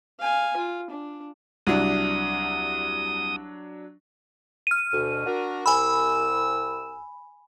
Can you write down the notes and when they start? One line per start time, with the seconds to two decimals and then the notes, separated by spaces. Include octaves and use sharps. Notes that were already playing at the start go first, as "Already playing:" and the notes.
0.20 F5 G#5
0.57 F4
0.90 D4
1.67 C2 F#3 D4 D#6
4.67 F6 D#7
4.93 D2 B2
5.26 D4 F#4 A#4
5.66 C2 G#5 B5 E6